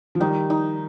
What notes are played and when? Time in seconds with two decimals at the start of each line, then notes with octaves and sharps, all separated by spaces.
0.15 F3
0.20 D#3 G3 D#4
0.50 D#4